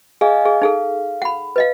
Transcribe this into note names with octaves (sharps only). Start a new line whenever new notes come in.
G#4 D#5 F5 G#5
G#4 F5
D#4 G#4 A4
F#5 B5
B4 D#5 F5